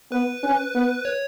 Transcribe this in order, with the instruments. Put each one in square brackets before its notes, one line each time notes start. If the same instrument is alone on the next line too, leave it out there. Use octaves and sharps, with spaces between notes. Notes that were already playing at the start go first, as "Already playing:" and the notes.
[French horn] B3 [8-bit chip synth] B4
[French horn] C#4
B3
[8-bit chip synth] C#5